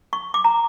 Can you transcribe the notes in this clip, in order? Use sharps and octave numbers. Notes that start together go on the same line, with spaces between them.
C#6
D6
A#5